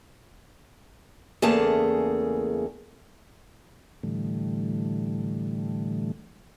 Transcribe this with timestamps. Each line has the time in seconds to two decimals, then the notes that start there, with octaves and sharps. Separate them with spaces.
1.42 E2 C#3 A3 A#3 G#4 A5
4.03 A2 D3 E3 G3 A3